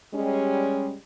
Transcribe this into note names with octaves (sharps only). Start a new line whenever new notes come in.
G3 G#3 C#4